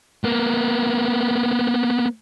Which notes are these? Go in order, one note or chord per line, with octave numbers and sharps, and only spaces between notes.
A#3 B3